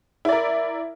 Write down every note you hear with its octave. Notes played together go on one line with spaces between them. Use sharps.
E4 A#4 D5